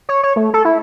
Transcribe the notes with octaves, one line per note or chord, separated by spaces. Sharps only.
C#5
C#5
A3
A4
E4